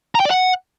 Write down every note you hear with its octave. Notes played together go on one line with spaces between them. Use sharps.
A#5
G5
D5
F#5